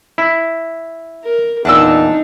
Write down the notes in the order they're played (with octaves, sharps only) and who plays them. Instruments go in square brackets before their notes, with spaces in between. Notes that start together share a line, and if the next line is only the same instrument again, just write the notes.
[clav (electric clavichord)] E4
[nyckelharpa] A#4
[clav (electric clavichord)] E2 A#2 [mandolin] D4 A5 E6 [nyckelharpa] D#4